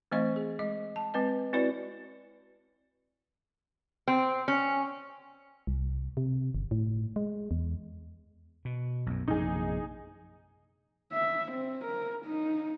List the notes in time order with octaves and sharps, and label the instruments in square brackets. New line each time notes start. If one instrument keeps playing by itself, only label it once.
[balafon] E3 A3 C4 C5 D#5 C#6
G#4
G#3 D#5
A5
G#3 C4 B4 D#5
C4 E4 F#4 B4 C#5 D5
[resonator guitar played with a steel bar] C4
C#4
[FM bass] C2
C3
G1
A2
G#3
E2
[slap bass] B2
B1 F#2
[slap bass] A#1 F#2 C3 [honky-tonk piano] D#4 G#4
[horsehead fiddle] E5
C4
A#4
D#4